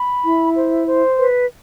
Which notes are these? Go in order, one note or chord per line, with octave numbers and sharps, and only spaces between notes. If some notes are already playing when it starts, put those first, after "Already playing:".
Already playing: B5
E4
C5
C5
B4